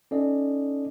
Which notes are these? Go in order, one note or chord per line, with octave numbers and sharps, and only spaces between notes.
C#4 D#4 A4 D5 D#5